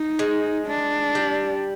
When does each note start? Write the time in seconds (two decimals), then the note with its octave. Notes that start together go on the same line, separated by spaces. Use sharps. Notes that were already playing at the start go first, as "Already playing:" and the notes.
Already playing: D#4
0.19 G#3
0.67 D4
1.15 G3